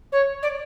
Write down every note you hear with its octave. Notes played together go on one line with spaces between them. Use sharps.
C#5
D5